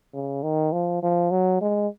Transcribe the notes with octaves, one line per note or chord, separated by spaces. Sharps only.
C#3
D#3
F3
F3
F#3
G#3